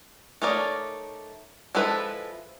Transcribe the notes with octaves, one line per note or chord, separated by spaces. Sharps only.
A3 D#4 A#4 C#5 D5
F3 G#3 E4 A4 B4